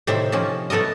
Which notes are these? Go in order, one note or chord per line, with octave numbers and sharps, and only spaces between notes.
A2 C3 D#3 C5 E5
C3 D#3 F3 A#3 C#4
A3 B3 A4 A#4 D#5